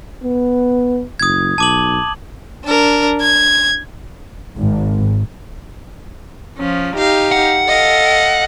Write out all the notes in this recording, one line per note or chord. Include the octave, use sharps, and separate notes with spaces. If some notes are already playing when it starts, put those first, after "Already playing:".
B3
F#1 D#6 G#6
B1 A5 D6 F#7
D4 A#4
G#6
G#1
F3 C#4
D#4 G4 F5
F#5
A4 D#5 F5